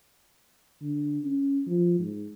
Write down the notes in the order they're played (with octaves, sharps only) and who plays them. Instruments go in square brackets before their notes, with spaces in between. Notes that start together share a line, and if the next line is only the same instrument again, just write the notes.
[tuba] D3
C#4
F3
G#2